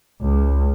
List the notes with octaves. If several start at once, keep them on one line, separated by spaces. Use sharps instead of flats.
C#2